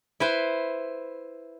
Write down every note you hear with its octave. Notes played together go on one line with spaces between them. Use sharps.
E4 B4 C5